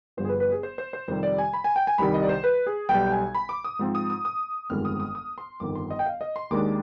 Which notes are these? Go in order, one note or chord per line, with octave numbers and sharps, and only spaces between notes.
G1 G2 F3 C5
G#4
B4
B4
G#4
C5
C5
C5
F2 C3 D#3 G3 C5
D5
G#5
B5
G#5
G5
G#5
C2 C3 D#3 G3 B5
D#5
D5
C5
B4
G#4
B1 B2 G3 G5
G#5
B5
D6
D#6
G#2 F3 C4
D#6
D#6
D#6
G1 F2 D#3 G#3 C4 F6
D#6
D#6
D#6
C6
G1 F2 D#3 D6
C6
D#5
G5
F5
D#5
C6
D#2 D#3 G#3 D4 D6